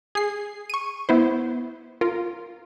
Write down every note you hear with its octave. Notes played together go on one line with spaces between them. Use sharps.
G#4 C7
C#6 D#7
B3 E4 C5
F4 A#4